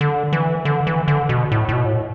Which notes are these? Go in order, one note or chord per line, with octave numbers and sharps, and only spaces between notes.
D3
E3
D3
E3
D3
B2
A2
A2
B2
A2